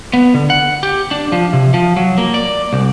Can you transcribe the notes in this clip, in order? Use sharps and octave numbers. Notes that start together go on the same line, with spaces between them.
B3
D3
F#5
G4
D4
F3
C3
F3
F#3
A#3
D5
C2